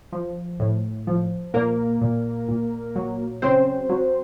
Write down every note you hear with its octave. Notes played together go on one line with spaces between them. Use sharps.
F3
A2
F3
A#2 A#3 A#4
A#2
A#2
F#3
C#3 C4 C5
F#3